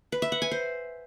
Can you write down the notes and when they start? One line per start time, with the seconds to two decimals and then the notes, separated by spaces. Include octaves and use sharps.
0.12 B4
0.22 E5
0.32 F#5
0.42 G#5
0.51 C5